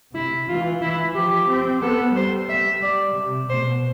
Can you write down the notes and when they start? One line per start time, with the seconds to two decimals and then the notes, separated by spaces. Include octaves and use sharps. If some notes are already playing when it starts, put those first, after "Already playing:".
0.14 C3 E4
0.48 E3 F4
0.82 E3 E4
1.15 F3 G4
1.48 C4
1.82 B3 A4
2.15 G3 C5
2.49 E5
2.82 D5
3.16 C3
3.49 B2 C5